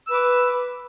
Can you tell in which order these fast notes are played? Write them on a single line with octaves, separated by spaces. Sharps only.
E6 B4 D6